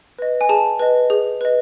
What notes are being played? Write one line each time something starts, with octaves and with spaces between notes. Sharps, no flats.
B4 D#5
G#5
G#4 A5
B4 D#5
G#4
B4 D#5